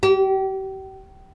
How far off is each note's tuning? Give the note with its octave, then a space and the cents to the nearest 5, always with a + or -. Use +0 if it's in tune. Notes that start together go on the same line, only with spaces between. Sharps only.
G4 -35